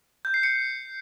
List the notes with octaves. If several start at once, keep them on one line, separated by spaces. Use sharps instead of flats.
G6
C7
C#7